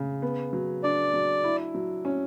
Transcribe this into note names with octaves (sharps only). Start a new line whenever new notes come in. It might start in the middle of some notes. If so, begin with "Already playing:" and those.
Already playing: C#3
B3
F#3
D4 D5
F#3
E4
F#3
C#4